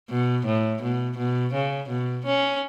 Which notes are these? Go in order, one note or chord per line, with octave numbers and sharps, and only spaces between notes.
B2
A2
B2
B2
C#3
B2
C#4